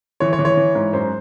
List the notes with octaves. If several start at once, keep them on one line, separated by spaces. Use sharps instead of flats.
E3 C#5
C#5
E3
C#5
E3
G#2
F#2 C5